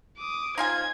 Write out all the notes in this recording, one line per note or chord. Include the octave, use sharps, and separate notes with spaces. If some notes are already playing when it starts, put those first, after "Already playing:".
D6 D#6
D#4 F4 C5 G#5 G#6